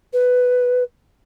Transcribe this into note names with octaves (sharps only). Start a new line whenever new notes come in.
B4